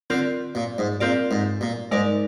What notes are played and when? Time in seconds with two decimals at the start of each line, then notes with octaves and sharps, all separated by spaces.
0.10 D3 C4 F4 A#4 D5
0.55 A#2
0.78 G#2
1.00 A#2 C4 F4 A#4 D5
1.31 G#2
1.61 A#2
1.91 G#2 G#3 D#4 A#4 D5